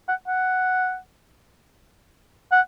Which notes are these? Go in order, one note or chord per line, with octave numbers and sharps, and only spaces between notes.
F#5
F#5
F#5